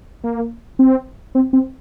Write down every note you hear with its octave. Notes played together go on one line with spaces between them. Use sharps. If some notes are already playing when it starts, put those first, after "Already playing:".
A#3
C4
C4
C4